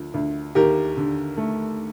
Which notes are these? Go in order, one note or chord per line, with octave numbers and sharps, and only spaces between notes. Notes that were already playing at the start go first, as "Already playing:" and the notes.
Already playing: D2 F3
D2
D#2 G4 A#4
D3
A3